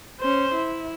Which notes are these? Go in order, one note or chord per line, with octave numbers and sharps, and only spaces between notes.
C#4 C5
E4